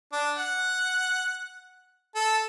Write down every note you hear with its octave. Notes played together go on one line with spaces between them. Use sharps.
D4
F#5
A4